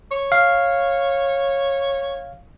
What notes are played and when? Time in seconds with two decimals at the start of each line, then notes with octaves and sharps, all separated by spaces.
0.11 C#5
0.32 F5